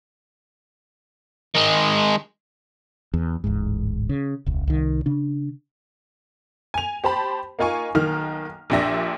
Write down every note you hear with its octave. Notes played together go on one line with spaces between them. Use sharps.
D#3 G#3
E2
D1 A1 G#2
C#3
E1 C#2
C2 D#3
C#3 D4
G#5 F7
G4 C5 A5 B5
A#3 D#4 F4 G#5 C#6
B1 D#3 A#3 F6
A#1 A#2 D4 G4 E5 A#6